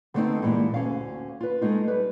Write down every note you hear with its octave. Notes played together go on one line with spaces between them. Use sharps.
D3 G3 A3 B3 C4 D#4
G2 A#2 E3 G#3
D2 C#4 F5
F4 B4
G#3 A3 D#4 F4
G3 B4